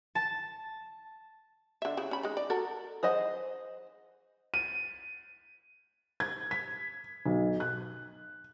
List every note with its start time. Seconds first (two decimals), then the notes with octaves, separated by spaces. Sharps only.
0.15 A5
1.82 D3 E5
1.97 C#3 E4
2.11 C#4 B5
2.23 G#3 D#4
2.37 D5
2.50 F#4 A4 A#4
3.03 G#4 C5 D#5 F#5
4.54 D#7
6.20 G#6
6.51 B6
7.26 B1
7.60 F#6